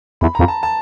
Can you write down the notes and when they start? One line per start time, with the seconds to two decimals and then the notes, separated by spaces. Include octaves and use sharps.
0.21 E2 B5
0.35 F2 A#5
0.48 A5
0.63 A5